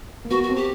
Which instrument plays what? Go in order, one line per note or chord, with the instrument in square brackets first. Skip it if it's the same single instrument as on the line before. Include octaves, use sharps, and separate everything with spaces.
[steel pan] A#3
[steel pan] B3 [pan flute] F#4
[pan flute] F#4
[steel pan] C4
[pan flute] G4